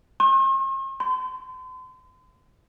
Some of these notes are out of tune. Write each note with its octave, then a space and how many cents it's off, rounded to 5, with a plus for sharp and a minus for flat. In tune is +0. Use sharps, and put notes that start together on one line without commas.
C6 +45
C6 -40